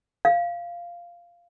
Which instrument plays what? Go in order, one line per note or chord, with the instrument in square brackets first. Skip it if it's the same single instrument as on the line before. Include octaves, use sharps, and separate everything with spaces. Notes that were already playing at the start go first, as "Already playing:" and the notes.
[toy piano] F5